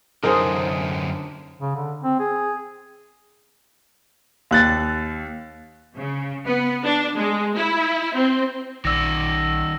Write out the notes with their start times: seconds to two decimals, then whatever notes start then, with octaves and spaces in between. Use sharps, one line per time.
0.23 F#2 D3 D#4 G#4 A#4 C5
1.61 C#3
1.75 D3
2.03 C4
2.19 G#4
4.51 D#2 F#6 A6
5.96 C#3
6.46 B3
6.84 D4
7.17 G#3
7.56 E4
8.14 C4
8.85 A#1 D#3 D5 E6 A#6